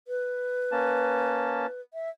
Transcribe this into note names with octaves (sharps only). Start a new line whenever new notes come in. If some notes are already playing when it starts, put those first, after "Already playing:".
B4
A#3 C#4 A5
E5